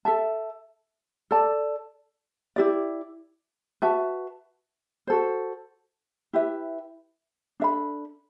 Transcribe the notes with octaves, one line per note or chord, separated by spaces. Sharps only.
A4 E5 A5
A4 D5 A5
E4 G4 D5
F#4 B4 E5 A5
F#4 A4 C5
E4 G4 B4 E5
D4 A4 E5 B5